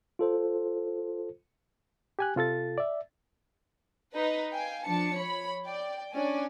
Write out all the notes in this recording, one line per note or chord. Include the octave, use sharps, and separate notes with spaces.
F4 A4 C5
G4 G#5 F#6
C3 F4 A4 A6
D5 E5
D#4 B4
F5 G5 G#5
F3 D4 A5 C#7
C#5 B5
D5 G5
C#4 D4 D5 G#5